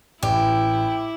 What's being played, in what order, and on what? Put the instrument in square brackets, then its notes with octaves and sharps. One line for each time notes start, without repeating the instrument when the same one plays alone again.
[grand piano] A1 [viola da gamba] E4 [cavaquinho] G4